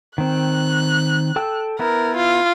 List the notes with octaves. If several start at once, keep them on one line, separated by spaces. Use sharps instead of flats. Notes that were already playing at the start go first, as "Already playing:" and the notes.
D#3 C4 F#6
A4 G5 E6
B3 E4 A#4
F4